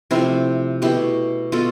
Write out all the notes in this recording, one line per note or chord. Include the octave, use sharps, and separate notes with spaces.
C3 F3 A3 C4 E4
B2 A3 E4 G4
B2 B3 F4 A4